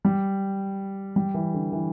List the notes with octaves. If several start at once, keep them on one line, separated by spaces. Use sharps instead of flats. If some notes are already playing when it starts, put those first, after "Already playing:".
G3
G3
E3
D3
E3